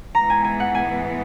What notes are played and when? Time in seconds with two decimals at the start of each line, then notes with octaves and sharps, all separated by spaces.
0.14 G#2 E3 G#3 B3 A#5
0.30 G#5
0.44 G#5
0.60 F#5
0.75 G#5